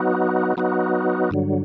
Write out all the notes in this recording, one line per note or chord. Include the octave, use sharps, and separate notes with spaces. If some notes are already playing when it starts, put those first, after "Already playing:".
Already playing: F#3 B3 D#4 F#4
F#3 B3 D#4 F#4
G2 D3 F#3